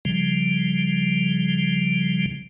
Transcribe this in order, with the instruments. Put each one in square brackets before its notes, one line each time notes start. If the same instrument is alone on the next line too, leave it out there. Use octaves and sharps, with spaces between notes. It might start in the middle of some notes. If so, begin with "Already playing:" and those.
[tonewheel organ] C#3 F3 G3